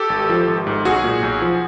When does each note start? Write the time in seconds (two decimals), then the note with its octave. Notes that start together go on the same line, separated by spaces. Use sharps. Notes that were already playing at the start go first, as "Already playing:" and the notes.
Already playing: G4 A4
0.10 G#1
0.29 F3
0.48 G#1
0.67 G#2
0.85 B1 F#4 G#4
1.04 A#2
1.23 B1
1.41 F3